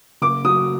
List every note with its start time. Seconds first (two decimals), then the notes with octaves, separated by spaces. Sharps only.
0.22 F#1 D6
0.44 F#3 D#6